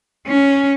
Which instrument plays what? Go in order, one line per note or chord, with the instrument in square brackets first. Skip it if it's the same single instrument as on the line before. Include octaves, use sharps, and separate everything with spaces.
[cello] C#4